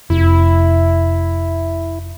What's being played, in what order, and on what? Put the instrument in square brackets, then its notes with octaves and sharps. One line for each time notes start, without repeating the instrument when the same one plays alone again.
[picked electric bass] F1 [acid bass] E4